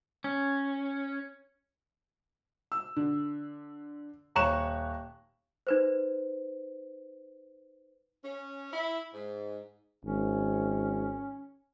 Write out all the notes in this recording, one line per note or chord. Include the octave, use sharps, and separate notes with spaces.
C#4
E6
D3
D#1 C#5 A#5 C#6 F#6 E7
D#4 B4 C5
C#4
E4
G#2
G#1 C#4